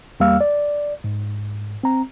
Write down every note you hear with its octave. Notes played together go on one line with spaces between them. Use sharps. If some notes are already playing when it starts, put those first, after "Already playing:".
E2 G3 A#3 F5 E6 F6
D5
G#2
C4 A#5